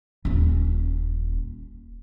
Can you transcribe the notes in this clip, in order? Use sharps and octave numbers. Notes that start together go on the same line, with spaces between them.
D#1 C#4